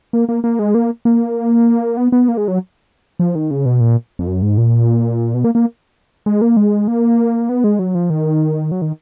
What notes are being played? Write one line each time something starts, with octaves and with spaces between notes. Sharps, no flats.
A#3
A#3
A#3
G#3
A#3
A#3
B3
B3
A#3
G#3
F#3
F3
D#3
C#3
B2
A#2
F2
F#2
G#2
A#2
B2
A#3
A#3
G#3
A#3
G#3
A#3
B3
G#3
F#3
F3
D#3
F#3
D#3